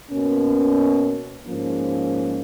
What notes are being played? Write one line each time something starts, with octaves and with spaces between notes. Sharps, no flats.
B2 A#3 C#4
G#2 F3 A#3 C#4